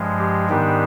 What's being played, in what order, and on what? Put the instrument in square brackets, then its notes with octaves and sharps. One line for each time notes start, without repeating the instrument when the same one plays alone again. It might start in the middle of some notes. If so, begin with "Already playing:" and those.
Already playing: [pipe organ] G2 F3 G#3
G4
G#2 D#3 G3 B3 D4 G4